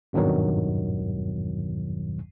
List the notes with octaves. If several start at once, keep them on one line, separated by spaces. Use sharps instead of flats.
G#1 E2 G2 B2 D#3 F#3